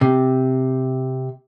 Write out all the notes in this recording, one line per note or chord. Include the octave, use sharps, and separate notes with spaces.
C3